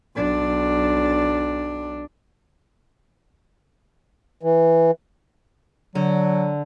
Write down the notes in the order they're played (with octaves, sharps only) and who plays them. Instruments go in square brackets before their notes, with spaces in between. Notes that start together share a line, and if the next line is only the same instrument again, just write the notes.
[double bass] B1 D4
[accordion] E3
[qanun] D3 [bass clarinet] F#3